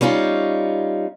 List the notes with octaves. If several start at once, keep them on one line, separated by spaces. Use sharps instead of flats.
G3 C#4 D#4 F4